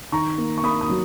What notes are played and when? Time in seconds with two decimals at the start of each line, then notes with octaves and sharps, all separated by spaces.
0.12 D#3 A#5 C#6
0.38 A#3
0.58 C#6
0.63 A#3 B5 D#6
0.81 B5 D#6
0.89 F#3